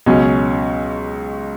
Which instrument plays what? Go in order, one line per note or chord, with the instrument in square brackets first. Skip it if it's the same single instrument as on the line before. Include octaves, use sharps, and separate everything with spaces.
[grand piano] C#2 B2 F#3 C#4